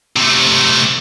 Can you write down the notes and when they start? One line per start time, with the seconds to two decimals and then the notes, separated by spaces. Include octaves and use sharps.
0.16 C3 A3